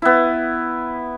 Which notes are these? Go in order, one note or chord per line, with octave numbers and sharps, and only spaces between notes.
B3 E4